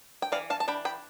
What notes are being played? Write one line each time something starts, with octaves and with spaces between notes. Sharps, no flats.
G5
E3 D5 F5
F5 A5
A5
D4 G5 B5
G5 B5